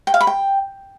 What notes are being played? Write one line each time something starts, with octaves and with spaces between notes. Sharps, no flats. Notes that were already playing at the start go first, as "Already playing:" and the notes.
G5
F5
B5
G5